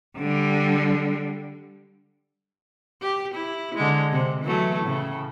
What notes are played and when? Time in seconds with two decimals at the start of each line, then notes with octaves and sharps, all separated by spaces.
0.18 D3 G3
3.02 G4
3.34 E4
3.75 D3 G#3
4.12 C3
4.43 E3 F#3 A3
4.83 A2 C#3